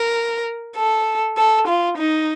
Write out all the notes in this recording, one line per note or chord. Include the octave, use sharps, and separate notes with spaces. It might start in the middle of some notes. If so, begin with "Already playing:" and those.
Already playing: A#4
A4
A4
F4
D#4